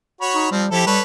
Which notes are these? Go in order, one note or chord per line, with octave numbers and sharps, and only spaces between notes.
F#4 C#5 B5
D#4
F3 G3 C4
F3 E4 G4 A4
G3 A4 B4 C#5